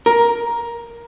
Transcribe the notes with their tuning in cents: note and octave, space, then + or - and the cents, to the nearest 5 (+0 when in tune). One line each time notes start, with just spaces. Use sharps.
A#4 +10